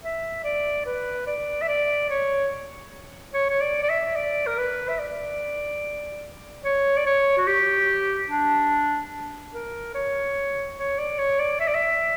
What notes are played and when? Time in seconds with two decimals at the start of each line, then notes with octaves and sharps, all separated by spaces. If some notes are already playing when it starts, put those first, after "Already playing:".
0.03 E5
0.44 D5
0.86 B4
1.27 D5
1.62 E5
1.68 D5
2.10 C#5
3.34 C#5
3.50 C#5
3.61 D5
3.83 D5
3.89 E5
4.16 D5
4.47 A#4
4.58 B4
4.89 E5
4.99 D5
6.65 C#5
6.97 D5
7.06 C#5
7.38 F#4
7.47 G4
8.30 D4
9.53 A#4
9.95 C#5
10.78 C#5
10.98 D5
11.18 C#5
11.39 D5
11.60 E5
11.67 D5
11.75 E5